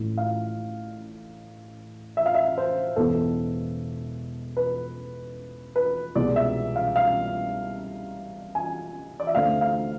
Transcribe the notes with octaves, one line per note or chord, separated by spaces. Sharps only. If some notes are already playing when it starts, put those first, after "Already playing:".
Already playing: A1 A2 E3
F5
E5
F5
E5
C5
E1 E2 B2 B3 A4
B4
B4
C2 B2 G#3 B3 D5
E5
F5
F5
G#5
D5
E5
D2 D3 A3 C4 F5
F5